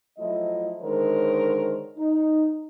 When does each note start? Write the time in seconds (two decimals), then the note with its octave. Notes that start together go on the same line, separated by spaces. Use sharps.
0.17 F3 F#3 A3 E4 D#5
0.81 D3 D#3 G#3 A#4 C5 C#5
1.97 D#4